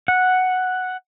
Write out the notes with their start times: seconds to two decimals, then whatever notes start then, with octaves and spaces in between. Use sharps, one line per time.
0.08 F#5